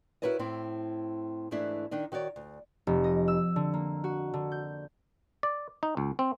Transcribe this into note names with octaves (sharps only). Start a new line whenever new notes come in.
E4 F#4 A#4 B4 C#5 D#5
A2 C4 E4
G#2 E3 A3 D4 E4
D#3 D4 D#4
D#3 F#4 C#5 D5
D2
F1
D#5
E6
D3
A#3
F#4
D3
G6
D5
D#4
C#2
C4